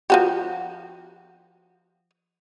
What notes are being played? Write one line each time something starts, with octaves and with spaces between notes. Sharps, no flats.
F3 F#4 G4